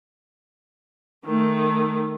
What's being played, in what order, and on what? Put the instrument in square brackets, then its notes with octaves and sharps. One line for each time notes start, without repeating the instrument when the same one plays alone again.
[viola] D#3 A3